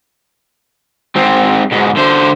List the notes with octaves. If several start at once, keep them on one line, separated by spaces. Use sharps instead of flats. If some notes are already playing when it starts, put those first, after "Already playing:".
G#2 C4
G#2 B2
D3 C5